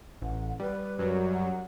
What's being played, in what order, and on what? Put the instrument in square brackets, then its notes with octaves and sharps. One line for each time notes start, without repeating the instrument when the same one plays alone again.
[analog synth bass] A1 [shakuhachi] F#5
[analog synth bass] G3 [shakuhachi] B4
[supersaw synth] F#2 F#3
[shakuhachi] F#5